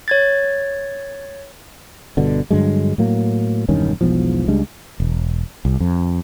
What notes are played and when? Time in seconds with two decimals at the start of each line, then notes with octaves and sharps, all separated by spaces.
0.08 C#5 G#6 A6
2.17 G1 B2 D3
2.51 G2 D3 F#3 G#3
2.98 A2 F#3 A#3
3.69 E1 G2 D#3 C#4
4.01 E1 B1 E2 F3
4.48 C#2 G3 G#3 D4
5.00 E1
5.65 C2
5.80 F2